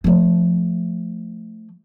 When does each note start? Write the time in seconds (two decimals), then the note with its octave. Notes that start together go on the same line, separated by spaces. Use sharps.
0.04 F3 A3